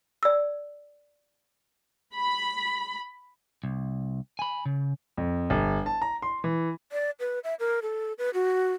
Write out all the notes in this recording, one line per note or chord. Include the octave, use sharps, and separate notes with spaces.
D5 E6
B5
C2
G#5 B5
C#3
F2
G1
A5
A#5
C6
E3
D5
B4
E5
A#4
A4
B4
F#4